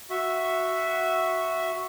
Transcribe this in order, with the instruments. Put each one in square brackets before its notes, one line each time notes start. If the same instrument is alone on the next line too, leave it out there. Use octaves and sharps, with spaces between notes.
[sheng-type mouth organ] F#4 E5